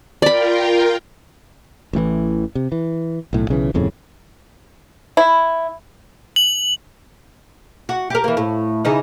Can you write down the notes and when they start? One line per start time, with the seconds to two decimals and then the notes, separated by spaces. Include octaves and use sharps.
0.22 F4 A#4 D5 G5 B5
1.93 A1 A2 C3 E3
2.55 C3
2.72 E3
3.33 B1 A2
3.49 B1 C#3 E3
3.74 D#1 F2 A2 C#3
5.17 E4
6.36 F#7
7.89 F#4
8.10 G4 A#4
8.24 E3 A#3
8.37 A2
8.85 C#3 E3 D#4